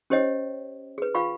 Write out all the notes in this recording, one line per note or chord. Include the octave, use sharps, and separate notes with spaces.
C#4 G4 C5 C#5 D#5 G5
G#4 B4
F4 F5 G5 B5 C#6